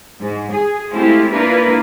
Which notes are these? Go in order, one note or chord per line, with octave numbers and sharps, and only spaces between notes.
G#2
G#4
G#3 A3 C4 E4 F4 G4
A#3 D4 E4 F4 A#4 B4